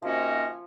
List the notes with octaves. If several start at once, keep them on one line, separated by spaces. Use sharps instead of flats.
C3 D#3 F3 A#3 C#4 F#4